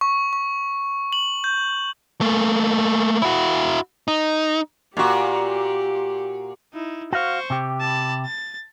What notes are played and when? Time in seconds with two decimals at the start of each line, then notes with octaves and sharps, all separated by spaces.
0.01 C#6
0.33 C#6
1.13 F#7
1.44 G6
2.21 A3 A#3
3.22 E4 F#4
4.08 D#4
4.97 A#2 F#4 G4
6.74 D#4 E4
7.13 F#4 C5 F5 C#6
7.50 C3 G4
7.81 A5 B5
8.26 A6